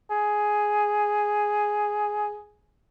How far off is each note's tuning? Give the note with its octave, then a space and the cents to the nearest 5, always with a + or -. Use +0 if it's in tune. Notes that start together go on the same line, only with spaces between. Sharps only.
G#4 +5